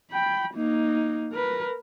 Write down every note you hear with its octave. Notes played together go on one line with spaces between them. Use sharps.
G5 B5
A#3 D#4
A#4 B4